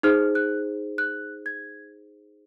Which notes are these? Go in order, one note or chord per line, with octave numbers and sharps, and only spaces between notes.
D#4 G#4 C5 F6
F#6
F#6
G#6